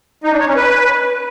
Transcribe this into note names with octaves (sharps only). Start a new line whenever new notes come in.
D#4
D4
C#5
C#4
B4